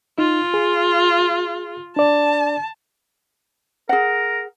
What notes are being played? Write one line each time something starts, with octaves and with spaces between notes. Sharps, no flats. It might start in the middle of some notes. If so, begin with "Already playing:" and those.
D#4 F4
G#4
D4 D5 A5
G#4 A#4 F#5